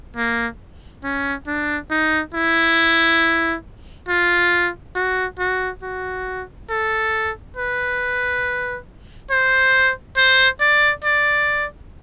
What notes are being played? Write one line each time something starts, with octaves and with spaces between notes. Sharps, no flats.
A#3
C#4
D4
D#4
E4
F4
F#4
F#4
F#4
A4
B4
C5
C5
D5
D5